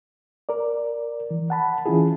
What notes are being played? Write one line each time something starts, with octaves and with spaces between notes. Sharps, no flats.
A#4 D5
E3
F#5 A5 B5
E3 C#4 E4 F4 G#4